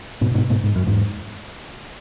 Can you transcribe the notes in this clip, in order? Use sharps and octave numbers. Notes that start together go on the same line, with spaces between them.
G#2 B2
A2
G#2 B2
G#2 B2
G#2
F#2
E2 G#2